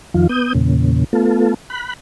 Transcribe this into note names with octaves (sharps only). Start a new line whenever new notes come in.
F2 D#3 F3 F4
B3 D#6 G6
E2 A#2 C#3
A3 B3 F4 A4
B5 F#6